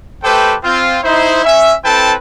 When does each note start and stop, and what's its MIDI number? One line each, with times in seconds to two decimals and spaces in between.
0.23 0.54 57
0.23 0.54 67
0.23 0.54 69
0.23 0.54 71
0.23 0.54 72
0.23 0.54 79
0.63 0.98 60
0.63 0.98 65
1.03 1.43 63
1.03 1.43 64
1.03 1.43 72
1.44 1.73 61
1.44 1.73 76
1.84 2.13 60
1.84 2.13 64
1.84 2.13 69
1.84 2.13 71
1.84 2.13 79
1.84 2.13 81